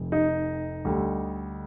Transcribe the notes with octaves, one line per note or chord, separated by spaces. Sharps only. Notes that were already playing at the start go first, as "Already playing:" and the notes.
Already playing: F1 F2 C3
D#4 D#5
D2 D3 G3